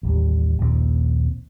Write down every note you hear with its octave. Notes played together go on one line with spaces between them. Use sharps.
A1 D#2 G3
A#1 D#2 F3 C4